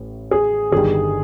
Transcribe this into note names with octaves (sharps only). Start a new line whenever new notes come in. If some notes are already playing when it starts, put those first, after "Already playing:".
Already playing: A1 A2
G#4
G1 G2 D#3 G3 G#4